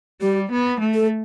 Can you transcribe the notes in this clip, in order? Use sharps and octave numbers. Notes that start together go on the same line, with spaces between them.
G3 G4
B3
A3
A4